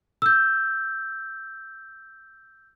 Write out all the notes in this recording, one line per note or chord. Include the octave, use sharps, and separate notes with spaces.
E6 G6